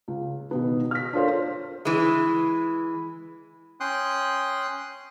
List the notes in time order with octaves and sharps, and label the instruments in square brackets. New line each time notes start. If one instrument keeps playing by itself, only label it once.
[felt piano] C#2
B2 D#3 B3
F6 B6
D4 F4 A4 A#4 C5 C#5
[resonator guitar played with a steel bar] E3 G#3
[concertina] C#4 G5 C6 D#6 F#6